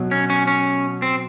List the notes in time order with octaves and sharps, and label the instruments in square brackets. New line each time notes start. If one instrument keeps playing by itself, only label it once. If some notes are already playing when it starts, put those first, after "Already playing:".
Already playing: [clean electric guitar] B2 F#3
C#4
C#4
C#4
C4